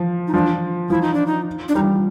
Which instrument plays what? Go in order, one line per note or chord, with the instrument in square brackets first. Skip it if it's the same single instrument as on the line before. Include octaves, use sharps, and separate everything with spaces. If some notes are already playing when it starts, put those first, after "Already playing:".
Already playing: [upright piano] F3
[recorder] D#4
[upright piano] F3 [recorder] D4
[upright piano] F3 [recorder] E4
[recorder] D#4
D4
D#4
D4
[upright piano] G3 [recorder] D#4